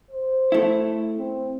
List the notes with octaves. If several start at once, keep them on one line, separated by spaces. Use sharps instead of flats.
C5
A3 E4
C4